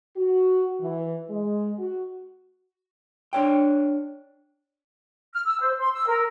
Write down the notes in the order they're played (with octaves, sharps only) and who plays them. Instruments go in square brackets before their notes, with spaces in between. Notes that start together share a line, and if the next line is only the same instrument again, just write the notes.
[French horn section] F#4
E3
G#3
F#4
[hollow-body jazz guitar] D4 C#5 G5
[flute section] F6
E6
C5
C6
E6
A#4